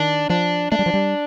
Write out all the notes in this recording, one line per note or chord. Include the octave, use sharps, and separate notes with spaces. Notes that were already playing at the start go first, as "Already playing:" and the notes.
Already playing: D#3 D4
F3 D4
A3 D4
G3
F3
G3